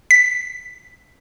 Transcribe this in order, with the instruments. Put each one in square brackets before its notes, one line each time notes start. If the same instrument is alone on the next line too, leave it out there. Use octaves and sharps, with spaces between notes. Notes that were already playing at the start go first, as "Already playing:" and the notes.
[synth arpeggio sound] B6